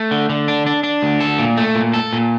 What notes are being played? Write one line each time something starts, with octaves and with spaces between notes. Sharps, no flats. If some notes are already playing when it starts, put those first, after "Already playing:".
Already playing: A3
D3
D3
D4
D4
D4
D2
A4
A#2
A3
A#2
A4
A#2